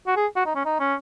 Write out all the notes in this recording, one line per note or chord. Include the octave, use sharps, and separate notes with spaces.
F#4
G#4
F#4
D#4
C#4
D#4
C#4